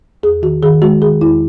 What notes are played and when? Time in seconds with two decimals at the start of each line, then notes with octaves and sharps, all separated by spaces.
0.23 E2 G#4
0.42 D#3 F#4
0.63 D#3 G#4
0.82 G#3 F#4
1.01 D#3 G#4
1.21 E2 E4